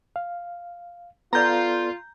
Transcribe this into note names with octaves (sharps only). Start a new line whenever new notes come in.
F5
B3 F4 A4 D5 A#5 G6